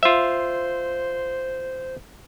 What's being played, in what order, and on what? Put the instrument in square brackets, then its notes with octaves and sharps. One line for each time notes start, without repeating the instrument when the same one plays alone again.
[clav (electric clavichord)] F4 E5 [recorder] C5